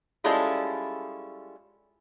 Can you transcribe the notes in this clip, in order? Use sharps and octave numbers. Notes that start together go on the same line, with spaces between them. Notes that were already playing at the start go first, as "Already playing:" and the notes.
G3 G#3 C#4 E4 F4 A4